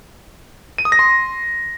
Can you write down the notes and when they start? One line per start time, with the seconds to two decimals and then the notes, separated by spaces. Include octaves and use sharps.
0.78 D#7
0.85 D#6
0.92 A#6
0.99 C6